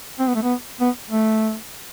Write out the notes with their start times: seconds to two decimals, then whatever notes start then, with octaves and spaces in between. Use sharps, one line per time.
0.19 C4
0.27 B3
0.35 A3
0.42 B3
0.80 B3
1.10 A3